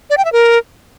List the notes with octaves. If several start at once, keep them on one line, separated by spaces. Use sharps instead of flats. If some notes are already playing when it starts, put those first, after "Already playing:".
D5
G5
E5
A#4